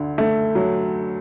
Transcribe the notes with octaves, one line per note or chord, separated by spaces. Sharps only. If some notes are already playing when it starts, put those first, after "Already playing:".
Already playing: D2 D3
A3
F#3